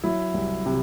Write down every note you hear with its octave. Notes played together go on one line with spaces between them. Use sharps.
F#3 E4
C2
C3